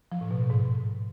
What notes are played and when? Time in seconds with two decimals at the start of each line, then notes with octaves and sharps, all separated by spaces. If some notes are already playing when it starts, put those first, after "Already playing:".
0.12 F3
0.21 A2
0.31 B2
0.40 A2
0.50 G#2